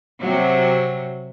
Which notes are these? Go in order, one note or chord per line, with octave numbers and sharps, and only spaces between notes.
C3 F#3